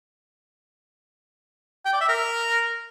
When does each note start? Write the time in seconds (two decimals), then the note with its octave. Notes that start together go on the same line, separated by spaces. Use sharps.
1.85 G5
1.93 D5
2.01 E5
2.09 A#4